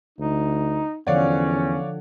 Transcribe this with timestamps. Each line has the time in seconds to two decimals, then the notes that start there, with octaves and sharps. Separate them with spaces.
0.19 D2 D#4
1.07 E2 D3 F3 C#4 C#5 D5 F5 F#5